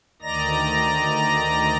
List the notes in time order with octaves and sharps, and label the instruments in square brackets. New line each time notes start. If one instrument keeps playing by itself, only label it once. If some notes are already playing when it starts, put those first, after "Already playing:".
[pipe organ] D2 D#3 D5 D#5 A#5 A#6